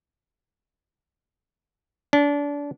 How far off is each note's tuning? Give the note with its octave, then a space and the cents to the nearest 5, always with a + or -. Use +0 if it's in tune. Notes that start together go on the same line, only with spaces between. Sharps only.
D4 -30